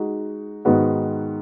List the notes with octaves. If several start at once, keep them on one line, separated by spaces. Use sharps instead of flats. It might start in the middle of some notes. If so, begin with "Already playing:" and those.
Already playing: G#3 D#4 F#4
G#2 D#3 G#3 B3 F#4